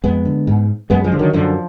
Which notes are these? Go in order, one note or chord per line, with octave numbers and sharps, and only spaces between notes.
F2 G#3 B3
D3
G#2
F#2 G#3 B3
F3 G#3
D3
D#3 F#3
F#2 D3 F3